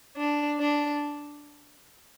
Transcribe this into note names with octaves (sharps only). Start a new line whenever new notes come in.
D4
D4